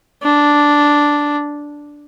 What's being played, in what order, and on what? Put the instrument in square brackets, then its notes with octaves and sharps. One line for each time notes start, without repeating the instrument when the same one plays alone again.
[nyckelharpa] D4